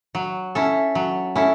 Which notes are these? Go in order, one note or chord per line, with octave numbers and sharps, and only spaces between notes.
F#3
C#4 E4 A4
F#3
C#4 E4 A4